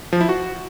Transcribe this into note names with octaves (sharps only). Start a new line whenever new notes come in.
F3
E4
F#4